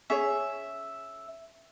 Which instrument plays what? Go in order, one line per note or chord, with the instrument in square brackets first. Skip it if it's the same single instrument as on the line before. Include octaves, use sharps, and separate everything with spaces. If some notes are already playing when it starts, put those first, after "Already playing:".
[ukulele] C#4 G#4 C#5 [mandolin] E5